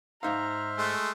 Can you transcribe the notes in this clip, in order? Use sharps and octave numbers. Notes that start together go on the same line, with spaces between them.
G#2 D#4 C5 E5 F5 A#5 F6
G#3 A3 C6